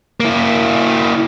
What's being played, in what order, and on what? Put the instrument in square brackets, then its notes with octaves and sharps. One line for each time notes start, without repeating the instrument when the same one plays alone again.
[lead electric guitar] A#3 E4